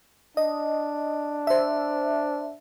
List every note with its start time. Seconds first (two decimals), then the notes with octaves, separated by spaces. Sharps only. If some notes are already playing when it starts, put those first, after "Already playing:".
0.37 D4 D#5
1.47 C5 E5